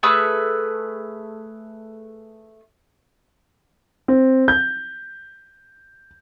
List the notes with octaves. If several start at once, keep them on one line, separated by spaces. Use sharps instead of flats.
A3 G#4 B4 C#6
C4
G6